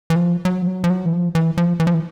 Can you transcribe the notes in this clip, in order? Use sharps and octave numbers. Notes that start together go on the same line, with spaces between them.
E3
F3
F#3
F3
F#3
F3
F#3
E3
F3
E3
F3
E3
F3
E3